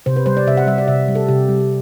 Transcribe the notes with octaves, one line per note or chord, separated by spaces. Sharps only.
C3 C5
B4
G3 C5
D5
C3 E5
F#5
G3 E5
D5
C3 E5
G3
A4
C3 G4
G3